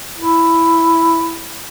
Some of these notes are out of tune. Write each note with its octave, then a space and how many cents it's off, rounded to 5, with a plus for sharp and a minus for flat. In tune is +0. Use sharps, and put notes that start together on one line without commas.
E4 +5